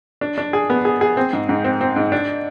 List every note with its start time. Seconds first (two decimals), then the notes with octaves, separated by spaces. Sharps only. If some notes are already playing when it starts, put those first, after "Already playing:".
0.21 D4
0.38 D4
0.53 G#4
0.70 B3
0.85 G#4
1.01 G#4
1.17 C4
1.33 G#2
1.49 G#2
1.64 C4
1.81 C4
1.96 G#2
2.12 D4